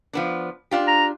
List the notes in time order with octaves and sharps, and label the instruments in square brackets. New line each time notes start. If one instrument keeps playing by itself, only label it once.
[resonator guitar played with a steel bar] F3 B3 D4
D4 F4 G4
[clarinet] A#5